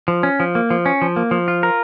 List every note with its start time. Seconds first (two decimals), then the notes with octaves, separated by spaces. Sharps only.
0.08 F3
0.23 C#4
0.40 F3
0.55 A#3
0.70 F3
0.86 C#4
1.02 F3
1.16 A#3
1.31 F3
1.48 F4
1.63 A#4